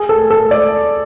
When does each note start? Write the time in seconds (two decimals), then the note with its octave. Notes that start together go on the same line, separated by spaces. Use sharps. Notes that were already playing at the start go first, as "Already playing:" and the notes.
Already playing: G#4
0.09 A4
0.30 A4
0.51 D5